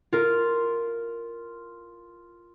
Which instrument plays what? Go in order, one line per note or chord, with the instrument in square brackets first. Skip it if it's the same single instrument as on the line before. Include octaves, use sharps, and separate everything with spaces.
[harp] F4 A#4